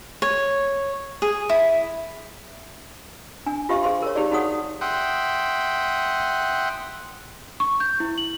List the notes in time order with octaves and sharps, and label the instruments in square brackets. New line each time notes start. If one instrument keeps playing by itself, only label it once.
[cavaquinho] C#5
G#4
E4
[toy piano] D4 G#5
F4 G4 C5 E5 F5 C#6
G#4 C5 F5 C6
A#4 C#5
D#4 G4 G#4 C#5 D5
D#4 F#4 G#4 C#5 F#5 D#6
[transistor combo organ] E5 F#5 G5 C6 D#6
[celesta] C#6
G6
E4
F#7